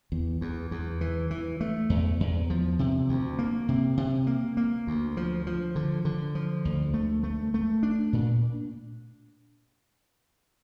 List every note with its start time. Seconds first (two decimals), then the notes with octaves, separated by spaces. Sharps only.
0.12 E2
0.41 E2
0.71 E2
1.01 E3
1.30 E3
1.61 A3
1.90 E2
2.20 E2
2.50 F3
2.79 C3
3.09 D2
3.39 A#3
3.68 C3
3.97 C3
4.27 A#3
4.57 A#3
4.87 D2
5.17 F3
5.47 F3
5.76 D3
6.05 D3
6.35 F3
6.65 D2
6.94 A3
7.23 A3
7.54 A3
7.83 D4
8.13 A#2